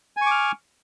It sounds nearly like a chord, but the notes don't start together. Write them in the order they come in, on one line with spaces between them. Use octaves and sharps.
G#5 C#6 D6 F6